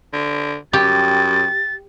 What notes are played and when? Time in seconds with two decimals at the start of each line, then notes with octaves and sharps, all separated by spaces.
0.13 D3
0.73 F#2 G4 A6